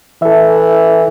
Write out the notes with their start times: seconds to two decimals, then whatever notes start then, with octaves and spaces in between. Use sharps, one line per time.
0.22 E3 A4 E5